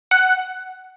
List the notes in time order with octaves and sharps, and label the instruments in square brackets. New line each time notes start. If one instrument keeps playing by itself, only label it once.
[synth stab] F#5